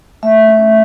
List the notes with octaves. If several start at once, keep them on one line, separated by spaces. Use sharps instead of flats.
A3 E5
C#4